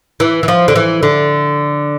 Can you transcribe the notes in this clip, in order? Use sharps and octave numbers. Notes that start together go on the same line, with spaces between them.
E3
E3
F3
D3
E3
D3